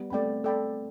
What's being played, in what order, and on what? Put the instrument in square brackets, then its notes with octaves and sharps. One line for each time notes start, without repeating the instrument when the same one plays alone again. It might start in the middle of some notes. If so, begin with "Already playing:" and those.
Already playing: [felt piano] G3 B3
[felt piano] A3 C4 [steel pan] A4 D5 G5 B5
[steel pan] A4 D5 G5 B5